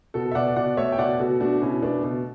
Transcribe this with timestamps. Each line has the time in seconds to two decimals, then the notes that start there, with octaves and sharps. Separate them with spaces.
0.14 B2 F#4 A4
0.31 E5
0.35 B2 D5 F#5
0.56 B2 D5 F#5
0.77 A3 C#5 E5
0.92 G5
0.98 B2 D5 F#5
1.20 B2 F#4 A4
1.40 A3 D4 F#4
1.61 B2 C#4 E4
1.82 A3 B3 D4
2.04 B2